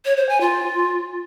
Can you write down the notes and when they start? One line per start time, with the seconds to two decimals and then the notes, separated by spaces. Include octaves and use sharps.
0.05 C#5
0.17 C5
0.29 G#5
0.41 F4